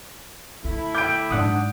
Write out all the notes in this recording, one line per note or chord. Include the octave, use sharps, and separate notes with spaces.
D2 A3 E4
G5 B5 D6 G6 D7
G#2 F#3 D4 F#5 D#6